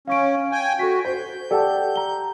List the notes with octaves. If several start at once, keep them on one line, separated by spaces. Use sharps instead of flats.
C#4 F5 C#6 D7
G5 G#5
F#4 A4 B6
C5 G6
G4 A4 D5 F#5 A5
A#5 G7